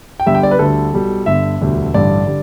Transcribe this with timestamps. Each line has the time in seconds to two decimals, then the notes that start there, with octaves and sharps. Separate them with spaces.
0.20 G5
0.26 G1 G2 D3 G3 E5
0.35 G5
0.43 D5
0.51 B4
0.59 D2 D3 G3 A4
0.93 B1 B2 G3
1.26 G1 G2 D3 E5
1.61 E1 D2 D3 G3
1.94 A1 G2 D3 G3 D5
2.27 D3 G3